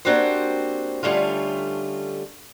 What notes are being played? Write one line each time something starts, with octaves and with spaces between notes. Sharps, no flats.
A#3 C4 D4 F#4 G4 C5
D3 G3 A3 C#4 F4